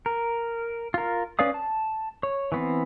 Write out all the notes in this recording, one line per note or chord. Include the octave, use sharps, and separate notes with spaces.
A#4
F4 A#4
C#4 B4 D5 F5 D#6
A5
C#5
E3 B3 C4